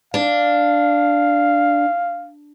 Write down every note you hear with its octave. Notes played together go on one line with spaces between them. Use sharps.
D4 F5